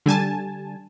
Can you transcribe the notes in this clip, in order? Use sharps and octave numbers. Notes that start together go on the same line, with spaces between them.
D3 G3 G#5 A5